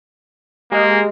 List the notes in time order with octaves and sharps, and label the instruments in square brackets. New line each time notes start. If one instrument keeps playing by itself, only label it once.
[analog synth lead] G#3 [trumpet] A#3 [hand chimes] G4 D#5